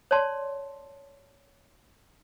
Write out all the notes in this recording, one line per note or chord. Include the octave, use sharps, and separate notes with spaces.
C#5 D5 A5 C6